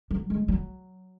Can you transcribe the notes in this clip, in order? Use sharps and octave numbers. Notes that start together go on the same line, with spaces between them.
F#3
G#3
F#3